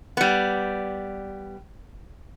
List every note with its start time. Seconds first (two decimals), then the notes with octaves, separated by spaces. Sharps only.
0.17 G3 B3